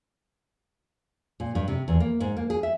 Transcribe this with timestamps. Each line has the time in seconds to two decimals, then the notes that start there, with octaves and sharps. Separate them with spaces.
1.40 A#2
1.55 G2
1.68 C3
1.88 E2
2.00 A#3
2.20 G#2
2.37 A#3
2.50 G#4
2.63 E5